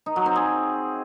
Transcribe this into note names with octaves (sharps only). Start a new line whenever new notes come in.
D#4
F#3
C4
G#4